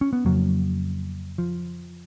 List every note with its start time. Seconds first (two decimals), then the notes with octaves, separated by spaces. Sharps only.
0.01 C#4
0.13 B3
0.25 F2 C#3 F#3 A#3
1.38 F3